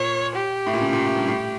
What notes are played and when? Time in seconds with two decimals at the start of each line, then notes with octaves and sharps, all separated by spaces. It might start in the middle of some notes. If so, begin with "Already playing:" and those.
Already playing: A#2 C#5
0.36 G4
0.66 A2
0.73 A#2
0.81 C#3
0.93 A#2
1.05 A2
1.16 G2
1.28 A2